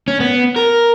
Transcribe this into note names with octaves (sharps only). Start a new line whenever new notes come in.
C#4
B3
A#4